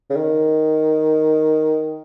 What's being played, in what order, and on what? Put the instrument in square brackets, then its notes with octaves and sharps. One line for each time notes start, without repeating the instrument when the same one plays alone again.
[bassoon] C#3
D#3